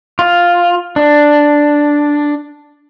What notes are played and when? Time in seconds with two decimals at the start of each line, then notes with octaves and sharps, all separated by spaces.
0.19 F4
0.96 D4